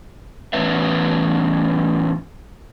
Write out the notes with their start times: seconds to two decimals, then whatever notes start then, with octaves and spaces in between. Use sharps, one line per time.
0.53 A2 E3 B3 C#4 B4 E5